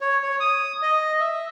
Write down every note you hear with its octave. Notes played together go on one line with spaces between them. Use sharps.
C#5
C#5
D#6
D#5
E5